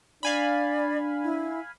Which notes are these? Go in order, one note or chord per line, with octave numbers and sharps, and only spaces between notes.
D4 D5 F5 G#5 B5
E4